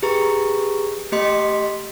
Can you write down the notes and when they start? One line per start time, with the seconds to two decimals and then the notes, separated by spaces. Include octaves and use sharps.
0.03 G4 G#4 B4 A#5 C#6
1.12 A3 G4 D#5 C6 B6